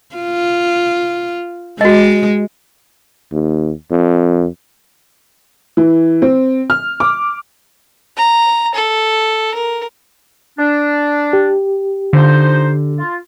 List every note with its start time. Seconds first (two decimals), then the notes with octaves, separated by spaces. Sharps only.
0.16 F4
1.81 G#3 F#4 D#5
3.32 D#2
3.91 F2
5.77 E3
6.22 C4
6.70 F6
7.00 D6
8.17 A#5
8.75 A4
9.55 A#4
10.58 D4
11.33 G4
12.13 D3 F3 D#4 C5
12.98 F4